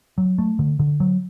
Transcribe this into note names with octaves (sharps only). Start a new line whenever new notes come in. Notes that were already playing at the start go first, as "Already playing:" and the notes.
F#3
A3
D3
D3
F#3